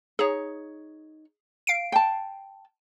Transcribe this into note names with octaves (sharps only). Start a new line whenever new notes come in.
D#4 G#4 C#5
F5 C7 D7
G5 A5